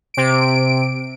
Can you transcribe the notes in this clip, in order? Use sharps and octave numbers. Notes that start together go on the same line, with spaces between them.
C3 D7